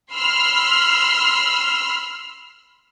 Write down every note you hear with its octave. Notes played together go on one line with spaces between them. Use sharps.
B5 C6 E6 F6